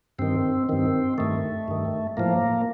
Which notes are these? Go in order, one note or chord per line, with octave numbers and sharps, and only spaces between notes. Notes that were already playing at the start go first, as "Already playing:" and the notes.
G2 D#3 C4
G2 D#3 C4
G2 D#3 A3
G2 D#3
A2 F3 A#3